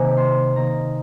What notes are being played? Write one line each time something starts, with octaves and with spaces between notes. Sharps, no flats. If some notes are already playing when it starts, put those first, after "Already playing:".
Already playing: C3 D#3 A#3 G#5
C6
D#3 A#3 D#4 A#5